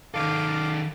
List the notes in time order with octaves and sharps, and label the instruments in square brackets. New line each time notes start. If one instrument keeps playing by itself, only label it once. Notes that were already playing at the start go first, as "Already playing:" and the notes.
[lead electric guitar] D#3 A4 [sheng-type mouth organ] F5 D6